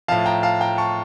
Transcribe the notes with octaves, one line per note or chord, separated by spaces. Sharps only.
A2 F3 F5 A5
G5 A#5
F5 A5
G5 A#5
A5 C#6